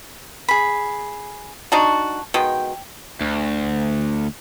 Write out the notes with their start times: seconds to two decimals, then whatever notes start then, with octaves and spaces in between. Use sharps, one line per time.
0.48 G#4 B5
1.72 D4 D#4 F#4 A5
2.34 B2 D#3 G#3 G5
3.21 D2